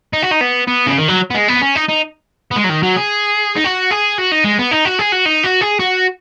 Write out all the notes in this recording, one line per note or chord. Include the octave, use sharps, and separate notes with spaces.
D#4
F#4
D#4
B3
B3
C#3
D#3
F#3
B3
G#3
B3
C#4
D#4
D#4
B3
G#3
F#3
D#3
F#3
G#4
D#4
F#4
G#4
F#4
D#4
G#3
B3
D#4
F#4
G#4
F#4
D#4
F#4
G#4
F#4